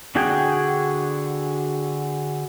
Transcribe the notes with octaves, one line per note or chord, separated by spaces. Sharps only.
D3 D4 F#4 G#4 G5